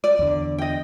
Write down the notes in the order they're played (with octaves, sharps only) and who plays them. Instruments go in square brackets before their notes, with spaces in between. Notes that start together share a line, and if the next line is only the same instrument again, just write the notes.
[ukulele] D5
[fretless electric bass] E2 D3
[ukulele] D#5 G5